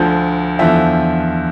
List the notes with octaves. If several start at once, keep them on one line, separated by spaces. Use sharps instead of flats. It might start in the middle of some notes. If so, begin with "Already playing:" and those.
Already playing: D2 D3 F3
E2 D3 F3 E5